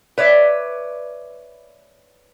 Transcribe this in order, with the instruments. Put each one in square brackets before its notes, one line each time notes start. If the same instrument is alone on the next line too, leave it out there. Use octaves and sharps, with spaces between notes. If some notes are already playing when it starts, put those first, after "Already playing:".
[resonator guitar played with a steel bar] B4 C#5 D5 E5